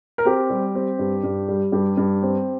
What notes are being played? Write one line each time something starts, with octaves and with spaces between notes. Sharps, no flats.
A#4
C4 G4
G3
C4
G2
G2
G3
G2 G4
G2
C4